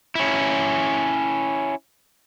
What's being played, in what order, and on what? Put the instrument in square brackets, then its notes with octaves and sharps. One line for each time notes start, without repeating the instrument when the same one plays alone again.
[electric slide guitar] C#4 E4